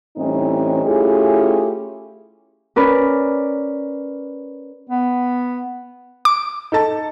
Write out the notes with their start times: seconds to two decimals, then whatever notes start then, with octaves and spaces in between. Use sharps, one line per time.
0.17 A2 E3 G3 C4 C#4 D#4
0.85 A3 C#4 E4 F4 G4 G#4
2.76 C#4 A#4 B4 D5
4.89 B3
6.25 D6
6.72 D#4 A4 A5